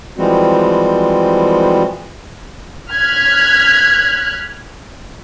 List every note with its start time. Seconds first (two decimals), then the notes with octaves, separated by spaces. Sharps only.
0.18 E3 F3 G3 G#3 C4 F#4
2.91 F6 F#6 G#6 B6